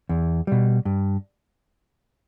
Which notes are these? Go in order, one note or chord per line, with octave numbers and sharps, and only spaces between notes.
E2
B2 G3
G2